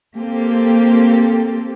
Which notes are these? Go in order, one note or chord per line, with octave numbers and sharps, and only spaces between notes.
A#3 C4 G4 A4